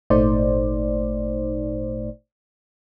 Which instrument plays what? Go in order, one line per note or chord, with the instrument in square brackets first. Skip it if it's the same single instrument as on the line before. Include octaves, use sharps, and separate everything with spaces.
[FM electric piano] G#1 A#2 A3 D#4 C5 D5